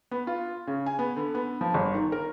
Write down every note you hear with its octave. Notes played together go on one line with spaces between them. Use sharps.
B3
F4
C#3
G#5
B3
D3
B3
F3
G1
D#3
A#4